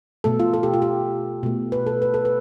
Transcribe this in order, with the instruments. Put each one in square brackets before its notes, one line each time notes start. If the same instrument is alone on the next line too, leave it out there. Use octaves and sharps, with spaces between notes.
[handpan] B2 A3 A4
F4
A4
G4
F4
G4
B2 A3
B4
A4
B4
A4
B4